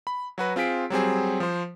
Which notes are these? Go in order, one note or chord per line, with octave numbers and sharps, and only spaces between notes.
B5
F#3 F#4 B4
C4 F4 G#4 B6 D7
F#3 G3 C4 G#4
F3 C5